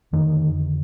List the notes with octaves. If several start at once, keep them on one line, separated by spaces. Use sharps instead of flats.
F2 D3 D#3